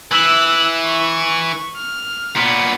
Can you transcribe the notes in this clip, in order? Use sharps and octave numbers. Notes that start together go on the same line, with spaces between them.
E3 E6 F#6
C#6
F6
A#2 B3